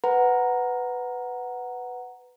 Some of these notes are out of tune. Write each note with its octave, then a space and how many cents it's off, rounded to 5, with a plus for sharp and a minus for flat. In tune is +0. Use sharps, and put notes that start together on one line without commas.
B4 +10 F#5 +0 A#5 +0